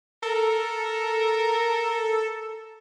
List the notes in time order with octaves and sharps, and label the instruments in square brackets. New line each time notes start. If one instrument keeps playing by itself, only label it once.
[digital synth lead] A4 [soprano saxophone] A#4